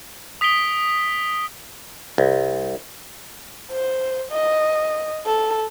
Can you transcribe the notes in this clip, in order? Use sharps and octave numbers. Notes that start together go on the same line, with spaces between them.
D#6 B6 C7 D7 G7
C2
C5
D#5
A4